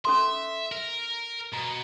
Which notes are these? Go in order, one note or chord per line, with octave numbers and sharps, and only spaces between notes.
C#4 A4 E5 C6
A#4
B2 A#5